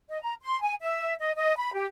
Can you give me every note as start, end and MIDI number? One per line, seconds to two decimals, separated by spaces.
0.08 0.19 75
0.22 0.34 82
0.42 0.60 84
0.61 0.73 80
0.81 1.14 76
1.20 1.31 75
1.35 1.54 75
1.57 1.71 83
1.74 1.86 67